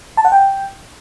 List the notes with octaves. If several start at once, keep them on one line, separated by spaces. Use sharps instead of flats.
A5
F#5
G5